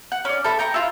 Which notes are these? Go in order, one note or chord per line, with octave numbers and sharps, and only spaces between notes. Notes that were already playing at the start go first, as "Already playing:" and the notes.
F#5
C#4 D5
A4 E5 B5
G5 A#5 C#6
E4 F4